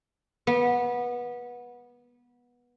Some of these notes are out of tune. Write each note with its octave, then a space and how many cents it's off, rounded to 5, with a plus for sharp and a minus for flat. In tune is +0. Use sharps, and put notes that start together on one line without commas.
B3 -20